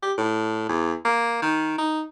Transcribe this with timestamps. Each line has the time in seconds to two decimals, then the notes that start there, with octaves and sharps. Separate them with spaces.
0.02 G4
0.18 A2
0.69 E2
1.05 A#3
1.42 D#3
1.78 D#4